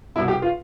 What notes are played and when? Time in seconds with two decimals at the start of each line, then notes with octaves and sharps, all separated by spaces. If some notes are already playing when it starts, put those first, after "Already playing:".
0.15 C2 B2 E4
0.28 G4
0.42 F4